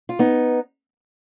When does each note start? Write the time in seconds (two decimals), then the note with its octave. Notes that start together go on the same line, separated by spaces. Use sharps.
0.09 F4
0.19 B3 D#4